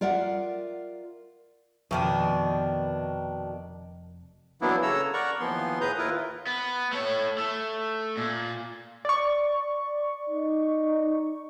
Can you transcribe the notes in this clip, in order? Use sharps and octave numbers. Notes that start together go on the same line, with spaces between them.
F4 A#4 D5 E5 F#5
F1 F2 B2 D#3 D4
E3 F#3 A#3 B3 D4 E4
C#3 A4 C#5 A#5 E6
A#4 D5 F#5 A#5 C#6
D#2 E3 F3 B3 C6
A2 G#4 B4 A#5 D#6 G6
D#2 E4 F4 A#4 B4
B3
A3 C#5
A3
A#2
D5 C#6
D#4